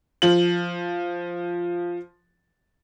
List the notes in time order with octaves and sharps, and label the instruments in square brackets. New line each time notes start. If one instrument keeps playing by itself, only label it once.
[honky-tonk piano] F3 F#7